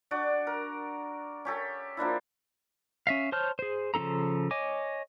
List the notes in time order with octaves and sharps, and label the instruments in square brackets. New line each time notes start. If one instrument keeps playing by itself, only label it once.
[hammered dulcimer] D4 F#4 D5
A#4
C#4 G4 A4
F3 A#3 D4 E4
[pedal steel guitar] C#4 E5 F5
C5 C#5 A5 F6 G6
G#4 C5
C#3 F3 D4 A4 A#5
C#5 D#5 G#5 D6